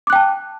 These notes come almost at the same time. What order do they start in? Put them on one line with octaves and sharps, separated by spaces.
D6 F#6 G5 A5